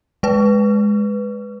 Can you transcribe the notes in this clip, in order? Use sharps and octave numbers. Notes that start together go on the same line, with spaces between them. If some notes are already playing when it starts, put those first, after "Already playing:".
G#3 B4